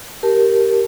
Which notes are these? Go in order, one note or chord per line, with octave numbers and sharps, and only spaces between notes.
G4 A#4 A5